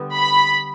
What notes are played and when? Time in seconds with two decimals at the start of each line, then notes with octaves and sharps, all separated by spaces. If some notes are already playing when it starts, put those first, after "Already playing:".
Already playing: D3 G3 B3
0.14 B5